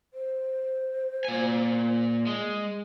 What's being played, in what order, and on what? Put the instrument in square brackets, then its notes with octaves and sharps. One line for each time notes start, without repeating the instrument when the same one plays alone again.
[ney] C5
[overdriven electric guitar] A#2 G#5
G#3